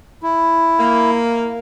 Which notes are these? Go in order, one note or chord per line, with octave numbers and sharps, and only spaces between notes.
E4
A#3